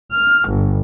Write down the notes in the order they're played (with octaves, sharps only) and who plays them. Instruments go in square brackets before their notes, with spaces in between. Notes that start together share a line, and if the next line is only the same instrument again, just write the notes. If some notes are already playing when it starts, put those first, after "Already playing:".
[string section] F6
G1